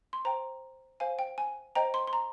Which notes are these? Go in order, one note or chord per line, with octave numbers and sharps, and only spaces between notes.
C6
C5 G5 A#5
C5 F5 G#5
G5
G#5
C5 D#5 G5 A#5
C6
C6
A#5